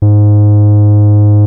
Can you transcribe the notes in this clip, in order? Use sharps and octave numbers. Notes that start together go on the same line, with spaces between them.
G#2